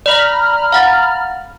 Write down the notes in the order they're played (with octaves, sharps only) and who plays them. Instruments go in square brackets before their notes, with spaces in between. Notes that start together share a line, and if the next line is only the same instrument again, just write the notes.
[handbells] D5 [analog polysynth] A#5 B5 F6
[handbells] F5 F#5 A6